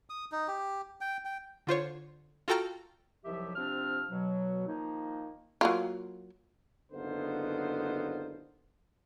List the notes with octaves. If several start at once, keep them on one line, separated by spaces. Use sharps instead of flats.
D#6
D#4
G4
G5
G5
D3 F4 C5 C#5
F4 F#4 A4 G5 A#5 F6
C2 D#3 F3 F#3 G4 E5
C3 F3 C4 D4 F6
B2 F#3
D#3 F3 A#3 D#4
F#3 A#3 F4
F#1 D3 B3 D#4 F4 C5